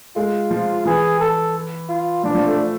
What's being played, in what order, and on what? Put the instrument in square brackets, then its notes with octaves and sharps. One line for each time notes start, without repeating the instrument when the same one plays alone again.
[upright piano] G#3 [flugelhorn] F4
[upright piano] F3
[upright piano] E3 [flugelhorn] G#4
[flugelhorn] A4
F4
[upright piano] F3 [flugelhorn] D4
[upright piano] F3
A3